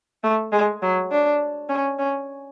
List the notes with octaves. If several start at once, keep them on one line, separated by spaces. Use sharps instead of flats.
A3
G#3
F#3
D4
C#4
C#4